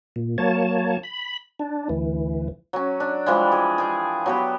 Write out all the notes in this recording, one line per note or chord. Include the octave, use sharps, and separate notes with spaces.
A#2
F#3 A#3 C#5 A5
B5
D4
D2 E3
F#3 C#4
D4
E3 F3 G3 G#3
G#4
G#4 G5
F#3 B3 G4